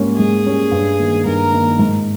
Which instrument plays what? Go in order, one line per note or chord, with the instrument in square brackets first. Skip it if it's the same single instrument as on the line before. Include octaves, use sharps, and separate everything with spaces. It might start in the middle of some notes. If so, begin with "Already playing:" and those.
Already playing: [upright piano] G#2 G3 A#3 C#4
[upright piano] G#2 [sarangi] G#4
[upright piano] G3 A#3 C#4
G2
D#3 A#3
[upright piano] G2 [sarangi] A#4
[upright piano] D#3 A#3
G#2